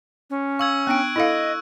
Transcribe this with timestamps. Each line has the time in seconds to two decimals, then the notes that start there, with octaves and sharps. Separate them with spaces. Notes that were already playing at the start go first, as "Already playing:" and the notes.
0.30 C#4
0.59 F5 C#6 E6 G#6
0.87 B3 D4 G5 F#6 D7
1.16 E4 A4 D#5 F5